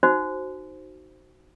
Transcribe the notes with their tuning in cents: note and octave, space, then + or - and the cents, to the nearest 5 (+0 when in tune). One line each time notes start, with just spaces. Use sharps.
D#4 +0 F#4 +5 C5 +0